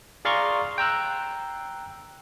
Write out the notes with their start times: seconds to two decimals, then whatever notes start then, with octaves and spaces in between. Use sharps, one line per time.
0.25 G#4 D5 F5 A#5 C6 C#6
0.78 G5 A#5 E6 F#6